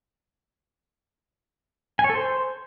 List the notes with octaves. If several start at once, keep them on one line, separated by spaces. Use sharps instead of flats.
G#5
C#5
A4
C5